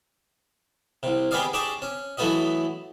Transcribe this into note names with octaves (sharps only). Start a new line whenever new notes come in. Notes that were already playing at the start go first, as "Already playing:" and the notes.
C2 C3
G3 B3 G#4 D5 D#5 F5
D4 G4 G#4 D5 A5 C#6
C#4
E3 F#3 A3 B3 F#4 D#5